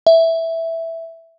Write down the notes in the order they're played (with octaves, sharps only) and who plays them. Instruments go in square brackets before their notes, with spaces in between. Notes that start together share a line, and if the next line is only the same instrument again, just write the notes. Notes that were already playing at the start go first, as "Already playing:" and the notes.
[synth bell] E5